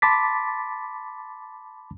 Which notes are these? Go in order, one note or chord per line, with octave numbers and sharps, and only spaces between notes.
A5 B5 C6 D6 A6 B6